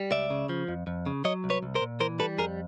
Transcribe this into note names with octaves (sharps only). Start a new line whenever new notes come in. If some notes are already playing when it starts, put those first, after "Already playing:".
Already playing: G3
C#2 D5 E5
C#3
F3
F2
F2
C#3
F#3 C#5 D#5
C2
B4 C#5
C2
A#4 C5
A#2
E3 A#4 C5
G3 A4 B4
F2 G#4 A#4